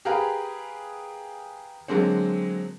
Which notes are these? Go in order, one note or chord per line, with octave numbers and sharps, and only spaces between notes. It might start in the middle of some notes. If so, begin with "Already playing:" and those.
G4 G#4 A#4 B4 F5 A#5
D3 F#3 G#3 A#3 C4